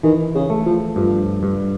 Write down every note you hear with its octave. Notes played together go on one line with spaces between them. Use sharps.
D#3 E3
C#3
A3
F3
G2 F3
G2